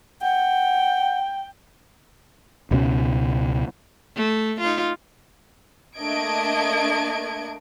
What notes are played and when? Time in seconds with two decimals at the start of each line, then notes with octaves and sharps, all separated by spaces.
0.22 F#5 G5
2.71 C#2 B2 G3 C#4
4.16 A3
4.60 D#4 F4
5.97 A3 A#3 D4 D#5 G#6 D7